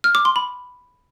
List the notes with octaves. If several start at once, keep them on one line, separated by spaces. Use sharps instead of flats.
F6
D6
C6
B5